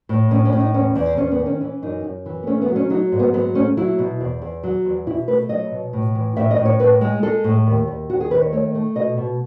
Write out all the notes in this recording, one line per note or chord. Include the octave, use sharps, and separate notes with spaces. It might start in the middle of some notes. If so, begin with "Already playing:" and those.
A2
A2 C#4
C#4
A2
D#4
E2 C#4
E2
E2 C#4
B3
D#3
C#4
E3 C#4
F#2 D#4
F#2
E3
B3
A3 C#4
B3
F#3
C#4
F#3 D#4
G#2
B3
F#3 B3
A3 C#4
F#3 E4
B2
E2
E2
F#3
E2
B2 E4
A3 B4
F#3 D#5
B2
A2
E3
A2 E5
D#5
A2
C#5
A2 B4
G#3
G#3 A4
A2
D#2
D#2
D#2 F#4
G#4
D#3 B4
C#5
A3 C#5
A3
B2 D#5
B2